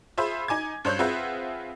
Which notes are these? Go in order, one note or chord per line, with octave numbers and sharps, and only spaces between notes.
F4 G#4 C5 E5 B5
D#4 G#5 D6 G#6
G2 C5 C#5 F#6 G6
C4 F4 G#4 B4 E5 F#5